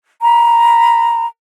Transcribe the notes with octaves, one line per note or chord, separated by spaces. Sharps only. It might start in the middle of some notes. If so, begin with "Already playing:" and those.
A#5 B5